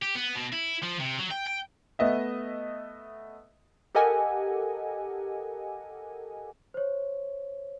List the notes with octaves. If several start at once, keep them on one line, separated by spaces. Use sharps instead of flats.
G4
B3
B2
E4
F3
C3
F#3
G5
G5
A3 B3 D#5 E5
G4 A4 A#4 D#5 F#5 G#5
C5 C#5